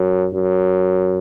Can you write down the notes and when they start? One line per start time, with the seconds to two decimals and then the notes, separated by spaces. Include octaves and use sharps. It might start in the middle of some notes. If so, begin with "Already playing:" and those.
Already playing: F#2
0.34 F#2